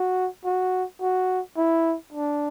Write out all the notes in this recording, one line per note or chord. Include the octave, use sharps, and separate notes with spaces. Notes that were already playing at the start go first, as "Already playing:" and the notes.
Already playing: F#4
F#4
F#4
E4
D4